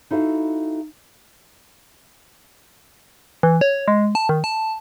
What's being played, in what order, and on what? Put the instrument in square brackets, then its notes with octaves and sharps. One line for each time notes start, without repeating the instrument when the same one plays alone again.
[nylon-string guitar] D#4 E4 F#4 A4 E5 F5
[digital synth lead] E3
C#5
G#3
A5
D#3
A5